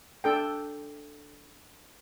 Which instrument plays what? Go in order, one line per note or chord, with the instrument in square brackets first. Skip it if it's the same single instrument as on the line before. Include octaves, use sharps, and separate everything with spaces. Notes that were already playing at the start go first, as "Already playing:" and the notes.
[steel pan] D4 A4 G5